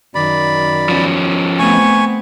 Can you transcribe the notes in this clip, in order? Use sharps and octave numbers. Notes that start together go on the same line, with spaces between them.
F#2 D#3 D5 B5
F3 C#4
A3 B3 C4 G#5 C#6